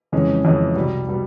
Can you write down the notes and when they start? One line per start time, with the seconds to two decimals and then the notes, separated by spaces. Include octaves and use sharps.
0.12 F2 C#3 E3 G#3 C#4
0.45 F2 C#3 E3 G#3 C#4
0.76 C2 B2 G3
1.08 B2 G3